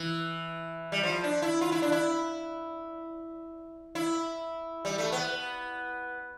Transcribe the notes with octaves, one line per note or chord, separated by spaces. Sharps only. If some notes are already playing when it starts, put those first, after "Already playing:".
Already playing: E3
G3
F3
D4
E4
F4
E4
D4
E4
E4
G3
A3
B3